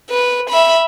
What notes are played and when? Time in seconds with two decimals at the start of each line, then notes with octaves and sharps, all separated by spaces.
0.10 B4
0.50 E5 B5